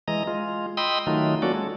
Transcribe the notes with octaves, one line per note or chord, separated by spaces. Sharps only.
E3 G#3 D#5 A#5
G#3 F4
D#5 G5 B5 C6 D#6 E6
D#3 F#3 A3 D#4 F4
F#3 A#3 C#4 F#4 A4 D5
G#3 A4